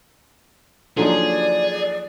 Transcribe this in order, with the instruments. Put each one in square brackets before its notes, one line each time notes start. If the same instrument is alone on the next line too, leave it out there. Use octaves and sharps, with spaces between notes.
[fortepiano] D3 A#3 [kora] F3 F#3 D#4 [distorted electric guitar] G#4 [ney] D5